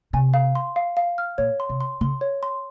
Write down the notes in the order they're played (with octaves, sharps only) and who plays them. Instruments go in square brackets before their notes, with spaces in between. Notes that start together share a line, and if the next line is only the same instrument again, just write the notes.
[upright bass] C3 [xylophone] G#5
[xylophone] F5
C6
F5
F5
F6
[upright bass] A#2 [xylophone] C#5
[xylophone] C6
[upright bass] C3
[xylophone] C6
[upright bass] C#3 [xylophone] C6
[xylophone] C#5
C6